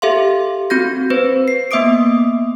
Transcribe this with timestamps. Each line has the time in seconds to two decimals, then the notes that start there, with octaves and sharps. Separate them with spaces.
0.02 G4 A4 E5 F5 C6
0.70 C4 F#4 G6 A#6
1.10 C4 B4 C5
1.48 C7
1.71 A#3 B3 E5 D6 D#6 D7